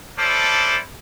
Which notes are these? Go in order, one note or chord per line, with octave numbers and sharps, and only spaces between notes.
C#4 D4 E4 A4 C5 D5